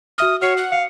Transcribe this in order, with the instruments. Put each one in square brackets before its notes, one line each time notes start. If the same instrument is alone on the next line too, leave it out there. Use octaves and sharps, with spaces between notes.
[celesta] F#4 E5 F6 [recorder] D#6
[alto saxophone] F#4 [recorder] C#5 [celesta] F6 C7
[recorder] F#5
[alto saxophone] F5 [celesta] C#7